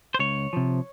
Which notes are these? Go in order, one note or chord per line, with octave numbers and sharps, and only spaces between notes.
C5
C#2 C#5
C3 F3